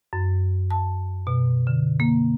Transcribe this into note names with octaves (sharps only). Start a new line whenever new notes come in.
F#2
A5
B2
D3
A#3